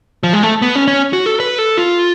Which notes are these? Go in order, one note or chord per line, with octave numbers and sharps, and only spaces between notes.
F3
G#3
A3
B3
C#4
C#4
F#4
A4
B4
A4
F4